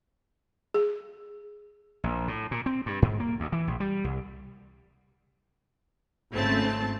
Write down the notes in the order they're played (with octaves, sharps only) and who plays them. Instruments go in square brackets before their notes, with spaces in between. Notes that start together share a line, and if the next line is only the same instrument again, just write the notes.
[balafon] G#4
[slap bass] A#1
A2
A#2
C4
G2
G#2
A#3
D2
E3
A#1
G3
C2
[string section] G#1 C#3 A3 C4 A5